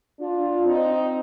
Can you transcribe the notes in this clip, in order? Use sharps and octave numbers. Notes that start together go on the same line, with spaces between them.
D4 F4
C4 D#4